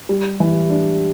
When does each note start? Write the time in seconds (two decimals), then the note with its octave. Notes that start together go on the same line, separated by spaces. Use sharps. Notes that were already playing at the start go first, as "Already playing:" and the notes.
0.09 G3
0.40 E3
0.70 D4